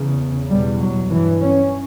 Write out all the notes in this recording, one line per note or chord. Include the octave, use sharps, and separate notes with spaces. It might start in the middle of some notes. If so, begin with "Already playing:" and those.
Already playing: E2 C#3
E2 B2 G3
F#3
G2 E3
C#4